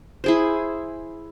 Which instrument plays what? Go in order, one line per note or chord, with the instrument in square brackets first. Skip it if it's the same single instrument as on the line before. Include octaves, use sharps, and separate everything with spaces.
[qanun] E4 G#4 C5